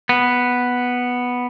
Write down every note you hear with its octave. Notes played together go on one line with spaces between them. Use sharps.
B3